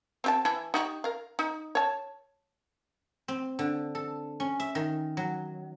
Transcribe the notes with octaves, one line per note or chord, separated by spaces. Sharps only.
C4 G4 A5
E3 E4 A5
D#4 F#4 G4
A#4 F5
D#4
C#5 A5
C4
D3
A4
C#4
E5
D#3
F#3